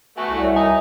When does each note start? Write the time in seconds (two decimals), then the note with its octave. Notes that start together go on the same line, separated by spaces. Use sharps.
0.18 A3 B3 F#4 G#5
0.31 C2 E4
0.42 C#5 E5
0.56 D#4 D#5 G#5